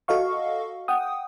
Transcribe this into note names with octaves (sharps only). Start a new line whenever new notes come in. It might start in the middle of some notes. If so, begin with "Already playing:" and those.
F#4 A4 D#5 F5 C#6
F#5 G5 D#6